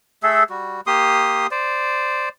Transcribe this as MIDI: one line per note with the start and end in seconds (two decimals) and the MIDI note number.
0.23 0.44 57
0.23 0.44 68
0.23 0.44 69
0.23 0.44 76
0.50 0.81 55
0.50 0.81 66
0.87 1.47 58
0.87 1.47 67
0.87 1.47 84
0.87 1.47 87
1.51 2.29 72
1.51 2.29 74